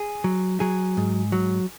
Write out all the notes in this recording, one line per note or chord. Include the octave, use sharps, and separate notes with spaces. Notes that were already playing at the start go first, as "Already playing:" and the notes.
Already playing: G#4
F#3
F#3 G#4
G#2
F#3